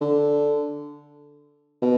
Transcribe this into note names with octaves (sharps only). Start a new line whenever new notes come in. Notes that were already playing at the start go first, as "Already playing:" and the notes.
D3
B2